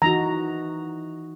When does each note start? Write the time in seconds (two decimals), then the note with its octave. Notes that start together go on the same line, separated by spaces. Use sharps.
0.02 E3 D#4 F#4 A#5